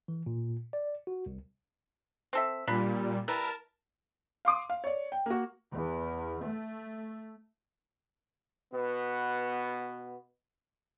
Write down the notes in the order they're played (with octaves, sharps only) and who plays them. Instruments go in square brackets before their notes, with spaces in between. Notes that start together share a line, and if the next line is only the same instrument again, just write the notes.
[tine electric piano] E3
A#2
D5
F#4
C2
[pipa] C4 A4 E5
[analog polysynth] A#2 G3 [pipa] D4 B5
[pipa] G3 E4 B4 [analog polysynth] A#4 A5
[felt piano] F5 C6 D6 D#6
F5
C#5 D5
G5
A#3 F#4
[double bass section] E2
A3
[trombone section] B2 B3